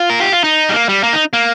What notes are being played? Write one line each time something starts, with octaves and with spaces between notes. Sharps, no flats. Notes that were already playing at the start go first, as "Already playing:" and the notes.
Already playing: F4
A#4
G4
F4
D#4
G3
A#3
G3
A#3
D#4
A#3